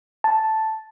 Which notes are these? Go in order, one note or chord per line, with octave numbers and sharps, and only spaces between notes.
A5